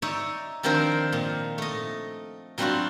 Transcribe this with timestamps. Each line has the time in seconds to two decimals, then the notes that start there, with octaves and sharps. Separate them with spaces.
0.02 D#4 C#5 D5 E5
0.63 D#3 F3 C4 D4 A#4 C5
1.12 A#2
1.58 A3 D#5
2.58 F#3 G3 C4 D4 F4 F#4